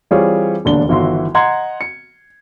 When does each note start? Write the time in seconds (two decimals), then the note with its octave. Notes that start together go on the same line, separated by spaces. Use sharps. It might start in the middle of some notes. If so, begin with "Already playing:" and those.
0.11 E3 G3 C4 F4 G#4 C#5
0.65 E1 D#2 D3 D4 G7
0.89 G1 D#3 E3 E4 F#4 C6
1.35 D#5 F#5 A#5 C6 G#6
1.81 C#7